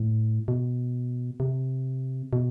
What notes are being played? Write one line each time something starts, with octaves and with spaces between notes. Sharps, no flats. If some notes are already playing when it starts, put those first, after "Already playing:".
Already playing: A2
B2
C3
B2